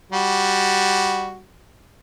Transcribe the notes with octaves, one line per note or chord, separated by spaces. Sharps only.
G3 F#4